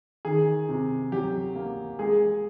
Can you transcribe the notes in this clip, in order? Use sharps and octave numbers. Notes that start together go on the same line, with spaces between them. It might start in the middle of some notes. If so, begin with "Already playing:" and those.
D#3 G#4
C3
F#3 G4
A#3
G#3 G#4